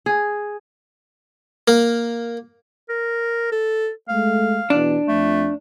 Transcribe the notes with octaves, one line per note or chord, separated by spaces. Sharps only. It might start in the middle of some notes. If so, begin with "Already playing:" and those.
G#4
A#3
A#4
A4
G#3 A3 F5
E2 B2 E3 D4
F2 A3